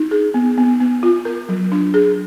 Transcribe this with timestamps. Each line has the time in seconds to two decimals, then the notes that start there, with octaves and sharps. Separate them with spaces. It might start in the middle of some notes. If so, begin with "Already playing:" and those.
Already playing: D#4
0.11 G#4
0.34 B3
0.58 B3
0.80 B3
1.03 F4
1.25 A#4
1.49 F#3
1.72 D4
1.94 G#4